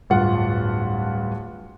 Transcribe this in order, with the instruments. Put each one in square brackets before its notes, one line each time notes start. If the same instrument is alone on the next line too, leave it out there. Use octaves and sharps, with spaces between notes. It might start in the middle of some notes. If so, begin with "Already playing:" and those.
[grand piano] D1 G2 F4 F#5